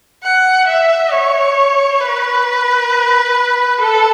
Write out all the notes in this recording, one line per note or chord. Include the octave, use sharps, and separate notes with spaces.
F#5
E5
C#5
B4
A4